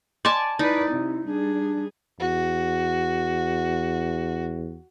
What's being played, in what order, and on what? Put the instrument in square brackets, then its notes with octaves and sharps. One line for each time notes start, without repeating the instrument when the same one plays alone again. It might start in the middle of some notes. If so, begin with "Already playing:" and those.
[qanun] D5 G#5 A5 [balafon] D#5 C6 D6
[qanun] D#4 [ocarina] E4 [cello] B4 D5
[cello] C3
[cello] G3 G#4 [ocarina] D4
[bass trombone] E2 [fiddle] F#4